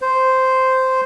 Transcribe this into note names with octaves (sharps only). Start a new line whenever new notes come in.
C5